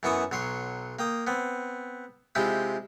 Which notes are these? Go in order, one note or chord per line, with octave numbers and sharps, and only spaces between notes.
F#2 E3 B3 E4 C#6 D#6
B1 F#3 C#5 C6
A#3 G5 D#6
B3 C4
C3 G#3 E4 F4 G4 G5